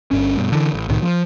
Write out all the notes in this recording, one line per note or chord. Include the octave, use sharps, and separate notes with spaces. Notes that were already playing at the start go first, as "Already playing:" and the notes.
G1 G2 C#4
G2 B2
D3 E3
A1
C2 A2 D#3
F3